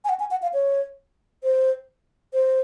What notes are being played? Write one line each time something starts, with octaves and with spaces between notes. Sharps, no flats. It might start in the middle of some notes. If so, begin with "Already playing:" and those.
G#5
F#5
G#5
F#5
F5
C#5
C5
C5